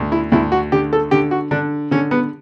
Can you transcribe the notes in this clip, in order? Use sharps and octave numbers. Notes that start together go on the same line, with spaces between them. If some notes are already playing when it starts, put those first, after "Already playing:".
Already playing: D2
E4
D2 E4
F#4
D3 G4
A4
D3 G4
F#4
D3 D4
D3 C#4
B3